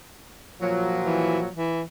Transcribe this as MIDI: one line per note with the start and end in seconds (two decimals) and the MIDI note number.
0.61 1.48 46
0.61 1.48 53
0.61 1.48 54
1.04 1.38 52
1.56 1.82 52